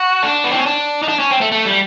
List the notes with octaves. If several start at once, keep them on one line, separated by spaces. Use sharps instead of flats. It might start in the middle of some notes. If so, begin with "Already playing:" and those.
Already playing: F#4
D4
B3
C4
C#4
D4
D#4
D4
C#4
C4
A3
A3
G3